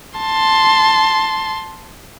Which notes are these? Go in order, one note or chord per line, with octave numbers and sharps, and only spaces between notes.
A5 C6